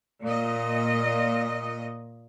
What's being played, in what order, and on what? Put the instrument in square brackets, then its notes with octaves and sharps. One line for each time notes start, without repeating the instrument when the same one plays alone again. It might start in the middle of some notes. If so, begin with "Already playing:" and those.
[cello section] A#2 D#5